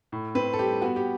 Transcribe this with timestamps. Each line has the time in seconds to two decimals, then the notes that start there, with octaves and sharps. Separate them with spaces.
0.12 A2
0.35 C4 B4
0.53 A4
0.59 G3 G4
0.82 B3 F#4
0.96 G4